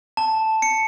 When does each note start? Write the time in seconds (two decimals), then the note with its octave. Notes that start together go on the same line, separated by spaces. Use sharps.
0.17 A5
0.62 C#7